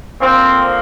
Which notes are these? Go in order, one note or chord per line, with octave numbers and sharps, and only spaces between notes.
D3 F3 A#3 C4